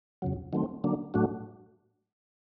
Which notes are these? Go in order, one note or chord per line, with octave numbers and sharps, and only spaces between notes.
F2 C#3 F#3
D#3 F#3 A3 C4
D3 F#3 A#3 D4
A2 F#3 A3 D4 F#4